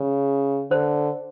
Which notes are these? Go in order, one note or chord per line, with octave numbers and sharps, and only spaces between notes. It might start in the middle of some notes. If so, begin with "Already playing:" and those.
Already playing: C#3
D3 C5